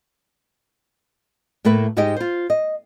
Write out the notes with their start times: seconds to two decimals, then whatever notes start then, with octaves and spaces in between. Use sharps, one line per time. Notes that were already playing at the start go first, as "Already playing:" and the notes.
1.65 A2 A3 A#3 B4 E5
1.97 G#2 G#3 D#4 G4 D#5 G5
2.16 F4 C5
2.50 D#5